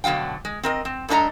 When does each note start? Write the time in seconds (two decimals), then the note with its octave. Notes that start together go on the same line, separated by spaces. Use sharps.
0.04 B2 D3 F#3 F5 G5
0.45 G#3
0.63 C4 A#4 D#5
0.85 C4
1.09 G2 A3 D4 A4 D#5 A#5